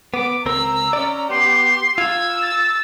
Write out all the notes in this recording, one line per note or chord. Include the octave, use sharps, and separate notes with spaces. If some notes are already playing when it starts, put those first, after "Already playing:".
B3 D6
C#2 C4 A#4 A#5 E6
C#4 D5
B3 G4 C6
F4 E6 G#6
A6